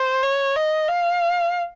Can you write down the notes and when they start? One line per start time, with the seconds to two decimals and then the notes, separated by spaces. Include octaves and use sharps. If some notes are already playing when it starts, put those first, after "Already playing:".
Already playing: C5
0.23 C#5
0.56 D#5
0.88 F5